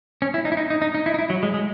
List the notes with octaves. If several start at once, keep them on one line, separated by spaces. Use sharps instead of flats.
C#4
E4
D#4
E4
D#4
D#4
D#4
D#4
E4
D#4
E4
F#3
G#3
G#3